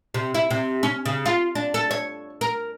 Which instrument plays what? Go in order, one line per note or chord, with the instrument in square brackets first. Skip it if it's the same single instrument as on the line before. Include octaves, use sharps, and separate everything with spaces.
[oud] C3
E4
C3
C#4
C#3
F4
D4
A4
C#5
A#4